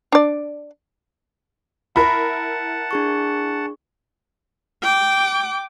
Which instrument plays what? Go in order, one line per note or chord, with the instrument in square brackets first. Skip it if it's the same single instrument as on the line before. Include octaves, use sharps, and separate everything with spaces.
[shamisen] D4 D5
[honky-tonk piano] E4 A#4 [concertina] F#5 A5 [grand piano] B5
[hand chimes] D4 G#4 C#6
[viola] G5 D6